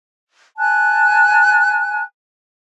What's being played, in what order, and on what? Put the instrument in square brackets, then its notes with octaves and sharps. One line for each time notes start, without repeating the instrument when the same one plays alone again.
[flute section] G#5 A5 F#6